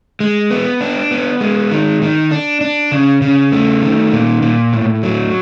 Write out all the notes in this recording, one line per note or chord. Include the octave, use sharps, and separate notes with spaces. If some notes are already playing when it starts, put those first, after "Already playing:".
G#3
B3
D4
B3
G#3
D#3
D#3
D4
D4
C#3
C#3
A3
D#3
A#2
A#2
A2
F#3